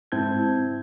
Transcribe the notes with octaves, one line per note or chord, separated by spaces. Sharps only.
G#2 C4 E4 A5 G6 G#6